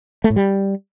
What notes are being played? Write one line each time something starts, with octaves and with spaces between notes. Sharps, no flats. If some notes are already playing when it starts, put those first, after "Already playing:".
A3
A2
G3